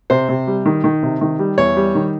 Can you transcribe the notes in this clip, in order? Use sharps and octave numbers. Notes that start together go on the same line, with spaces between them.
C3 C5
C3
G3
D#3
D#3
C3
D#3
G3
E2 C#5
G3
D#3